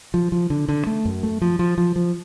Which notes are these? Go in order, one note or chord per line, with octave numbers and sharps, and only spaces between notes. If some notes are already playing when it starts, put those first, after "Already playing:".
F3
F3
D3
D3
A3
F#2
A3
F3
F3
F3
F3